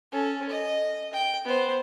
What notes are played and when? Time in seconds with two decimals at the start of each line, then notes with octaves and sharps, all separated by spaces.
0.12 C#4 A4
0.49 D#5
1.13 G5
1.44 B3 C5